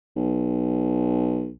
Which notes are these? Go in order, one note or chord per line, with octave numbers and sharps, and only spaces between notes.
B1